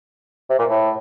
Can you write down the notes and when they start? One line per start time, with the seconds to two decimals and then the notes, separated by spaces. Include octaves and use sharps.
0.50 C3
0.59 A#2
0.70 A2